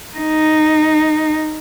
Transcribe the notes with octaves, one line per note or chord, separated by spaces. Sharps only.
D#4